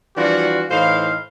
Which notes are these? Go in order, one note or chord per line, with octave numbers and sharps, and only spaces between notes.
E3 F3 G3 D4 F4 F#4
A2 E3 D#4 C5 F5